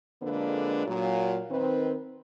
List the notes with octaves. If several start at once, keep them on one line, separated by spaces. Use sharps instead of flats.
F2 D3 G#3 A#3 D4 B4
A#2 F#3
D#3 C4 B4